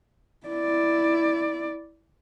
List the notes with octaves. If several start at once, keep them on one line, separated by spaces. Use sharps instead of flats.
E4 D5